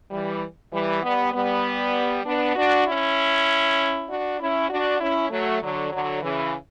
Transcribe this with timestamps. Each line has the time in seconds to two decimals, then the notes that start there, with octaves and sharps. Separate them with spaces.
0.11 E3 G3
0.72 E3 G3
1.03 G3 B3
1.33 G3 B3
2.25 B3 D4
2.55 D4 F#4
2.86 C#4 E4
4.08 D4 F#4
4.40 C#4 E4
4.69 D4 F#4
5.00 C#4 E4
5.31 F#3 A3
5.62 D3 F#3
5.92 D3 F#3
6.23 C#3 E3